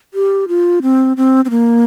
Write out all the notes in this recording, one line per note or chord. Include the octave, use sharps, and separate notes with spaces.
G4
F4
C4
C4
C4
A#3